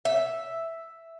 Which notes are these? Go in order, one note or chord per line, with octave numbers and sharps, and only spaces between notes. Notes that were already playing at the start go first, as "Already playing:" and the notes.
E5